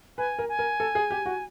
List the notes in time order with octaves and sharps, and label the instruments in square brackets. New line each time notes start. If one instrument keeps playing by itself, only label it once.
[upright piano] B4 [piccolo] G#5
[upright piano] A#4
[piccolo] G#5
[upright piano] A#4
A4
G#4
G4
F#4